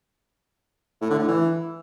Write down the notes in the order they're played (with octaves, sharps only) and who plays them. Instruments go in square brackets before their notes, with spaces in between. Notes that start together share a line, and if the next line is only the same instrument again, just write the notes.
[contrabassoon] A2
D3
A2
E3